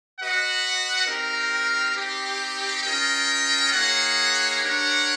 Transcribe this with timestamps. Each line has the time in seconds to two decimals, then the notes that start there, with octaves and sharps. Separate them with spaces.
0.19 F#4 B4 D#5 F#5
1.07 C4 D#4 G4 A#4
1.95 C4 D#4 G4
2.84 C#4 F4 A#4 D#5 G5
3.72 A#3 D#4 G#4 C#5 F#5
4.61 D4 G4 A#4 C#5 F#5